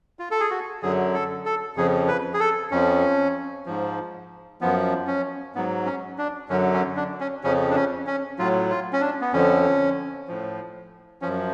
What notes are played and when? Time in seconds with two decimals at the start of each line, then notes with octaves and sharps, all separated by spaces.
0.19 F4
0.31 A4
0.40 G#4
0.50 F#4
0.83 F#2 D3 F#3 G#4
1.14 A4
1.46 A4
1.76 F2 C#3 F3 G#4
2.08 B4
2.34 G#4
2.40 A4
2.71 F2 F3 C#4
3.66 G#2 F3
4.61 F#2 F3 B3
5.07 C#4
5.55 G#2 F#3 B3
5.86 C#4
6.18 D4
6.49 F#2 D3 F#3 C#4
6.74 C#4
6.97 D4
7.20 C#4
7.43 F2 C#3 F3 C#4
7.71 D4
7.75 C#4
8.07 C#4
8.39 A2 F#3 F4
8.70 F4
8.93 C#4
9.01 D4
9.21 B3
9.33 F2 D3 F3 C#4
10.28 A2 F3
11.22 F#2 F3 C#4